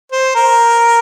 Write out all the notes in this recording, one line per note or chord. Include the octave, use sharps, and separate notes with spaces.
C5
A#4